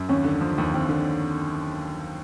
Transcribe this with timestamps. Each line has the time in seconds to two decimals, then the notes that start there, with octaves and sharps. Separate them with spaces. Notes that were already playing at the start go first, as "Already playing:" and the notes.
Already playing: F#2
0.09 D#2 C#4
0.25 D3
0.41 F3
0.58 D#2
0.73 D#2 C4
0.89 D3